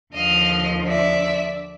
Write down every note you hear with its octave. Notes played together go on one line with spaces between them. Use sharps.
D#2 D3 F3 D#5 F5
D5 E5